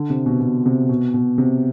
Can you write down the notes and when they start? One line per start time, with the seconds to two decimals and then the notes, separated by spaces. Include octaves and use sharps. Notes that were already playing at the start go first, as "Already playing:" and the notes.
Already playing: D3
0.10 C3
0.26 B2
0.41 B2
0.66 C3
0.89 B2
1.14 B2
1.38 C3